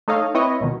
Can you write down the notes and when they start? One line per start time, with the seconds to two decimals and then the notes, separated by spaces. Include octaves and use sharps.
0.08 A3 D#4 A4 C#5 D#5 F5
0.34 C4 E4 B4 C#5 D#5
0.60 C#2 B2 D#3